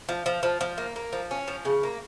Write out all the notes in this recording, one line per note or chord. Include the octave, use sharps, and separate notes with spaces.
F3
F3
F3
F3
A#3
A#3
F3
C#4
F3
C#3
A#3